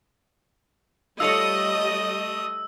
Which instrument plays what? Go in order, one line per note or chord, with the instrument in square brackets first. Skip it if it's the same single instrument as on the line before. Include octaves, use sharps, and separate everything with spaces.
[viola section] G3 D#5 [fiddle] A3 D#6 [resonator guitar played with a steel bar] F4 A4 C#5 [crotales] E6